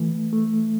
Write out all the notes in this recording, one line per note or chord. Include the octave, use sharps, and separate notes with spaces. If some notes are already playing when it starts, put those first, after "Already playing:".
Already playing: E3 A3
A3